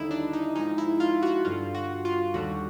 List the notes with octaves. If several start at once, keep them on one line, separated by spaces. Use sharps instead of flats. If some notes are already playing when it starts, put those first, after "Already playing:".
Already playing: D#2 D3 G3 D#4 E4
D4
D#4
G#2 F3 G#3 D#4
E4
F4
F#4
G2 D3 G3 F4
F#4
F4
D#2 D3 G3 F#4